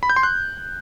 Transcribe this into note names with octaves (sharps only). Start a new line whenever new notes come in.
B5
G6
C6
F#6